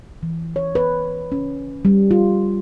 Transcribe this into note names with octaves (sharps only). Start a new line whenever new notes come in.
E3
C#5
B4
C#4
G3
F4